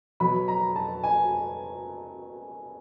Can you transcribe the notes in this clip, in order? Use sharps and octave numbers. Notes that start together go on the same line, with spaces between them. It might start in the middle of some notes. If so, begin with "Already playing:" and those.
B2 F#3 B5
A#5
A5
G#5